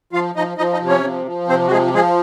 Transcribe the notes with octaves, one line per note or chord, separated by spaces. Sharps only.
F3 F4 F5
F3 D#4 D#5
F3 D#4 D#5
D#4 D#5
C3
C#4 C#5
F3
F3
C3 C4 C5
F#4
F3 G#3 G#4
F3 G#3 G#4